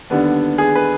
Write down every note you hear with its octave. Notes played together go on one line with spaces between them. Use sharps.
D#2 D3 G3 B3 D4
G#4
B4